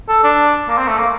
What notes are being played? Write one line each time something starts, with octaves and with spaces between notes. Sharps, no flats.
A4
D4
A#3
C4
A3
A#3